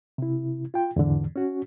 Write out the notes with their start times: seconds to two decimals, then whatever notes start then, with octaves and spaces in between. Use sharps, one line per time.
0.18 C3 E4
0.74 F4 G5
0.96 E2 G#2 D3 E3
1.36 C#4 F#4